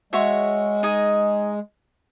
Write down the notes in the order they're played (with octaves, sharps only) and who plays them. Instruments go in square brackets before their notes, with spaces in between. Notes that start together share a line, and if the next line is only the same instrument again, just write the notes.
[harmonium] G#3 [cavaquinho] F#4 C#5 E5 C6
[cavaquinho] D#4 G#4 D#5 G#5